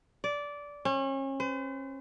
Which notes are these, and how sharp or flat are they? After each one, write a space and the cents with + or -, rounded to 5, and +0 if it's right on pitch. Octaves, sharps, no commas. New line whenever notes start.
D5 -15
C#4 -35
C5 -45